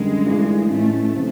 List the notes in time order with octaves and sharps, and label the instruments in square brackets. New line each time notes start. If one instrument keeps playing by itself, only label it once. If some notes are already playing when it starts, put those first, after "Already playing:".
Already playing: [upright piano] F#2 D3 G3 [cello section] G#3
[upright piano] G2 E3 A3 D4 F4
[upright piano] A2 E3 G#3 C#4 [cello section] A3
[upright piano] C3 F3